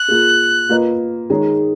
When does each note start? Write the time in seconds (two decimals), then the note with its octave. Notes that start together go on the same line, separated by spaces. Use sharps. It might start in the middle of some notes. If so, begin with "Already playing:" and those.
Already playing: F#6
0.08 A#3 F4 G#4
0.69 A#3 F4 B4 D#5
1.30 D#3 G#3 D#4 G#4 C#5